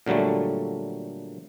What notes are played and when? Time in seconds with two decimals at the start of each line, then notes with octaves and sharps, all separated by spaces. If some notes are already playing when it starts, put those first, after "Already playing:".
0.06 A#2 D3 F#3 G3 A3